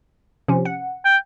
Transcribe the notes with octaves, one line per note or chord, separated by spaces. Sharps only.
C3 F3 C#4
F#5
G5